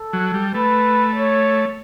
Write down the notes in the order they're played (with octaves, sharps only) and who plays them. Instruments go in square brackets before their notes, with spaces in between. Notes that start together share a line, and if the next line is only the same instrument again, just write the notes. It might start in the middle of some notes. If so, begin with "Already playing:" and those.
Already playing: [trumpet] A4
[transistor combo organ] F#3
G3
[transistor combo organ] A3 [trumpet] B4
[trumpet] C#5